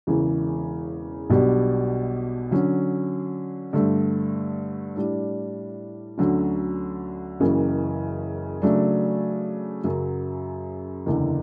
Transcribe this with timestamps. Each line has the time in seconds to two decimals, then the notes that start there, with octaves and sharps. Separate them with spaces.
0.07 E1 E2 C#3 E3
1.30 B1 B2 G3 D4 G4
2.51 D3 F#3 C#4
3.73 G2 D3 A3
4.96 A2 G3 D4
6.18 D2 D3 F#3 C#4 F#4
7.40 F#1 F#2 C#3 E3
8.62 C#3 F#3 A3 D4
9.84 F#2 C#3 F#3
11.06 F#1 E2 D3